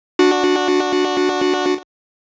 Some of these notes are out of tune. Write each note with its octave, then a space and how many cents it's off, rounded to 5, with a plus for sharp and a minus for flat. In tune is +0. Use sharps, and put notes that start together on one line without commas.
D4 +0 F#4 -15